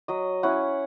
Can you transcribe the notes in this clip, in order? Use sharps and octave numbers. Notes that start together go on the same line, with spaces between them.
F#3 D#5
C#4 E4 F#5